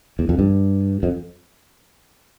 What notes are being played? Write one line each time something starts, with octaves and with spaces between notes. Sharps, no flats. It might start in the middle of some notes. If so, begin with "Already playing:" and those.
E2
F2
G2
F2